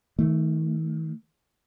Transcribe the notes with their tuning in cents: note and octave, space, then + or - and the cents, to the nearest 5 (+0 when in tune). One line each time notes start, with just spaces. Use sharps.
D#3 +40 A3 +0